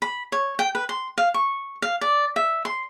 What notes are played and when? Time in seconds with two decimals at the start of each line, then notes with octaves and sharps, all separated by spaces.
0.02 B5
0.32 C#5
0.59 G5
0.75 B4
0.89 C6
1.18 F5
1.34 C#6
1.82 F5
2.01 D5
2.36 E5
2.65 C6